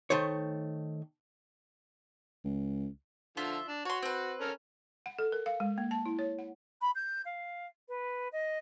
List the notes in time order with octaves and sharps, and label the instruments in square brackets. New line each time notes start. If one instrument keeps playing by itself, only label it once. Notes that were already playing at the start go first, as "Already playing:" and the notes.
[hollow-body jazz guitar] D#3 A3 C5 C#5
[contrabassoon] C#2
[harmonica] D3 F3 [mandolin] F4 E5
[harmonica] D4
[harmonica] F#4 [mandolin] C#5 C6
[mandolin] C4 B4
[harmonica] C#4 A4 A#4
[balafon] F#5
A4
A#4
F5
G#3
A#3
A5
E4
C#5
F#5
[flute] B5
G6
F5
B4
D#5